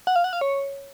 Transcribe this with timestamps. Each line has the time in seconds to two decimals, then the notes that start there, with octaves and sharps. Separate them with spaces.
0.07 F#5
0.16 F5
0.24 F#5
0.33 F5
0.41 C#5